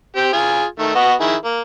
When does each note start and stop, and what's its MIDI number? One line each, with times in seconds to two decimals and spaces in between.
0.16 0.32 60
0.16 0.32 67
0.33 0.64 65
0.33 0.64 68
0.33 0.64 80
0.79 0.94 51
0.79 0.94 57
0.95 1.13 59
0.95 1.13 66
0.95 1.13 75
1.20 1.35 51
1.20 1.35 64
1.20 1.35 68
1.44 1.60 58